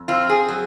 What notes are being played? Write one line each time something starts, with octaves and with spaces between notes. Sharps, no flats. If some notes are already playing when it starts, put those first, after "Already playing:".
Already playing: F2
C4 F4
G#4
F#3